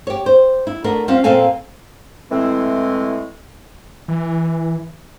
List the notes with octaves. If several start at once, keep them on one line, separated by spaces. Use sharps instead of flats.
G4 C#5
C5
E4
A3 B3 D4 A#4
G3 C4 C#4 F4 E5 F5
F2 A#2 C4 A4 F5 G#5
A2 E3 G#3 C4
E3